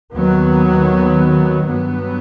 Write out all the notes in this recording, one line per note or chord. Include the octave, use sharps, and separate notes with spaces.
D#2 D#3 F#3 B3
G2 F#3 B3